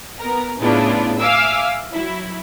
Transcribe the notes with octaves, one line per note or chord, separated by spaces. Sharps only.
B3 A#4
A2 C#3 B3 D4 E4 F4
E5 F5 G#5 D6 E6
F#3 E4